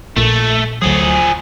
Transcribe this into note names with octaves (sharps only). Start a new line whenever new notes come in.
A#1 A#2 A3
D2 F3 F#3 G#4